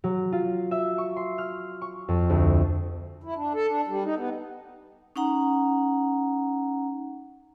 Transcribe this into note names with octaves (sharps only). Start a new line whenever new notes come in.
F#3
F4
E5
C#6
C6
F6
C#6
F2
D2
E4
D4
A4
D4
G3
D#4
B3
C#4 D#4 F#5 A#5